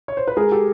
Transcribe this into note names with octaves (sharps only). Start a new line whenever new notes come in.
C#5
C5
B4
G#3 G#4 A#4
G4 A4